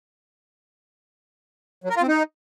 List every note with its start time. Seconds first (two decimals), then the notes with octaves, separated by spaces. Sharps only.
1.84 F#3
1.90 A#4
1.96 F4
2.02 C4
2.08 D#4